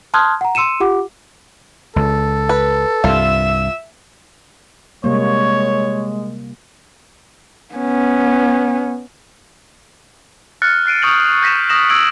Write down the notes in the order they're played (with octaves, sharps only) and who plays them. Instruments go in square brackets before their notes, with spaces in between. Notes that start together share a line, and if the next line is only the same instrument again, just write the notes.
[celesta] A5 C6 D#6 F6 F#6 G#6
F#5 A#5
C6 E6 C#7 D#7 E7
F4 G4 F#5 D6
[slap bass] C#2 [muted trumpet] A4
[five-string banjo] B4
[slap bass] C2 G2 [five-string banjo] F4 [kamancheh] E5 E6
[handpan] C3 G3 A#3 [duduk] G#3 [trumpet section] C#5
[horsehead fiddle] B3 C#4
[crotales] F6 F#6 A6 C#7
F#6 C7 D7 D#7
C#6 D#6 G6 A6 F7 F#7
G6 A#6 B6 D#7 E7
D#6 A#6 E7 F#7
E6 G#6 B6 D7 F#7